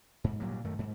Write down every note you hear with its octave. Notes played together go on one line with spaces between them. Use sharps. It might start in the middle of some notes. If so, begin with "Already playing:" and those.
G#2
A#2 F#3 G3
F#2 D#3 A3
G#2